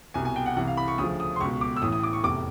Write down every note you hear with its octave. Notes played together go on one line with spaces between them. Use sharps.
C2 B2 G#5
G#5
G5
F#5
C2 C3 E3 F#5
F5
B5
C#6
D2 C#3 F3 D#6
D#6
C6
C#2 B2 C#6
D6
E6
A1 A2 E3 D#6
D#6
D6
C#6
F1 E2 C3 D6